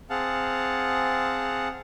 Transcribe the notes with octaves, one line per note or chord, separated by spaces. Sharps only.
C4 G#4 F5 F#5 A5